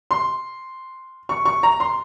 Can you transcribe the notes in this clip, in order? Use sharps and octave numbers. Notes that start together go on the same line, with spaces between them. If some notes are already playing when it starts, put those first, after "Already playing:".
C6
C#6
C#6
A#5
C6